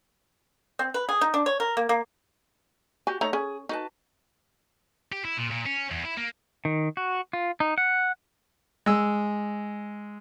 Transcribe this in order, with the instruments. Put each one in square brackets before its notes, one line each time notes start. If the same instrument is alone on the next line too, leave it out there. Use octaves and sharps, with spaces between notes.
[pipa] C4
B4
G#4
D#4
D4
C#5
A#4
A#3
A#3
[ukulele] F#4 G4 [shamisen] G#5
[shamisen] A3 [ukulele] D#4 C#5 A#5
[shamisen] C#4 [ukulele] G#4
[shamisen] D#4 [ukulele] F#4 B4 A5
[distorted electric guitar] G4
E4
A#2
A#2
C#4
E2
E4
A#3
[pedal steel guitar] D#3
F#4
F4
D#4
F#5
[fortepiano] G#3 E6